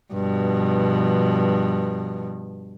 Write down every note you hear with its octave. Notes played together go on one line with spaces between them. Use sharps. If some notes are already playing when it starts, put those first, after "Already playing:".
G2 B2 F3